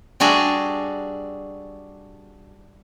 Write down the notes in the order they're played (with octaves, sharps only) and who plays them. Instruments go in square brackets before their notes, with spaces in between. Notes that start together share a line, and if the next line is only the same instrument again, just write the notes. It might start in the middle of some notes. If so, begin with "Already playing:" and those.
[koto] G3 D4 F#4 G#4 E5